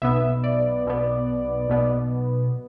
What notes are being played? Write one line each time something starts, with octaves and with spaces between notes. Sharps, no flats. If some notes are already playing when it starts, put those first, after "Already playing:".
B1 B2 B3 E5
D5
B1 B2 B3
B1 B2 B3